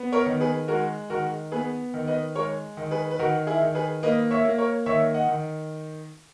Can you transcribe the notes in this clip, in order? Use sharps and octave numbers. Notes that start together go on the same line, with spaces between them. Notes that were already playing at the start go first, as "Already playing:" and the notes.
Already playing: B3
A#4 C#5
D#3
G#4 B4
G#3 F#4 A#4
D#3 F#4 A#4
B3 G#4 B4
D#3
B4 D#5
G#3 A#4 C#5
D#3
G#4 B4
B4
D#3 F#4 A#4
E4 G#4
D#3
G#4 B4
A#3 B4 D#5
C#5 E5
A#3
A#4 C#5
D#3 C#5 E5
D#5 F#5
D#3